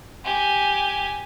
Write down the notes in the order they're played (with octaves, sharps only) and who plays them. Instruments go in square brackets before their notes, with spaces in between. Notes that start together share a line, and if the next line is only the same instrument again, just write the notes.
[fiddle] G4 G#5